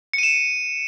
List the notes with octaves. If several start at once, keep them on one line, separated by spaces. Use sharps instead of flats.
C#7 D#7 E7